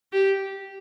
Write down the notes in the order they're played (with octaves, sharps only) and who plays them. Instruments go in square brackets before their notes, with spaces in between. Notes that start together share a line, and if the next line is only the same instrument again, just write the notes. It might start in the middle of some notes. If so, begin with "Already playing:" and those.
[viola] G4